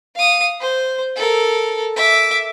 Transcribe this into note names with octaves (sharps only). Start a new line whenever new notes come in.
F5 D#6
C5
A4 A#4
E5 D6